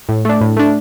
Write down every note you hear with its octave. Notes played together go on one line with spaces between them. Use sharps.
A2
A3 D4
A2
A3 D4